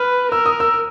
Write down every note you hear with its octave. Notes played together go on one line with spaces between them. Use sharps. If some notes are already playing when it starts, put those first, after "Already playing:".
Already playing: B4 F6
A#4 E6
D#6
E6